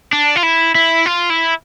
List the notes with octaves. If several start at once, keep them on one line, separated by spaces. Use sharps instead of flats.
D4
F4
E4
E4
F4
E4